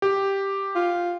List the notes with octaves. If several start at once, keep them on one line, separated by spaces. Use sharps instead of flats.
G4
F4